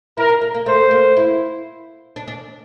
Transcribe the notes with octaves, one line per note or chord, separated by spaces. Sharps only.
E4 A#4
D4
A#3
A#3
A3 C5
A#3
E4
D4
D4